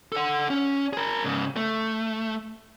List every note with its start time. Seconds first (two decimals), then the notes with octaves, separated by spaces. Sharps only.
0.12 A4 F#5
0.50 C#4
0.93 G#4 A#4
1.24 G#2 C#3
1.56 A3